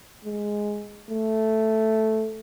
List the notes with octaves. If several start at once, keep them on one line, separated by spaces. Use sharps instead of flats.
G#3
A3